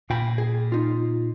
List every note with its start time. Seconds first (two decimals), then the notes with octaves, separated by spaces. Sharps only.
0.10 A#2 F4 G5 B5
0.38 G#4
0.72 D#4 F4